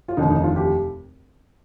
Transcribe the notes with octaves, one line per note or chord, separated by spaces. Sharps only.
F4
F1 D#2 D3 D#4
D#4
F4
G4